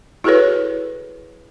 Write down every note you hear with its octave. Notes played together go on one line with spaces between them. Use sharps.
E4 F#4 G#4 A4 B4 C#5